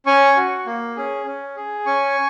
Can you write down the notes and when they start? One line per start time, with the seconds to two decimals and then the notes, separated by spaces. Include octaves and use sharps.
0.06 C#4 G#5 C#6
0.36 F#4
0.66 A#3
0.97 C#4 G#4
1.26 C#4
1.56 G#4
1.86 C#4 G#5 C#6